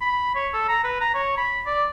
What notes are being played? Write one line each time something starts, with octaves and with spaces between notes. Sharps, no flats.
B5
C#5
A4
A#5
B4
A#5
C#5
B5
D5